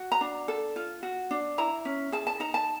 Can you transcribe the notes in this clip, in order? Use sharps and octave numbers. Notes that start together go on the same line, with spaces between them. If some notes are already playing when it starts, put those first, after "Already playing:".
Already playing: F#4
A#5
D4
A4
F4
F#4
D4
E4 A#5
C#4
G#4 A5
A5
D#4 A#5
A5